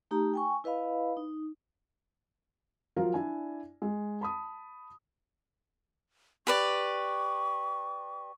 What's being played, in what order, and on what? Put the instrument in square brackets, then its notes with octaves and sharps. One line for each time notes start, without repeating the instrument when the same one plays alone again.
[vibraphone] A3 D#4 G4 A#5
G5 G#5 C#6
E4 B4 D#5 F5 B5
D#4
[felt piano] F3 F#3 F4 A#4 F5
D4 E4 D5 G#5
G#3
A5 B5 D#6
[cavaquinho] G4 B4 D5 [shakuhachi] C#6